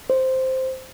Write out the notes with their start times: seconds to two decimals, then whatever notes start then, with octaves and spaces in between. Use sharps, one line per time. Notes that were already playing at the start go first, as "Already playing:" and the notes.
0.10 C5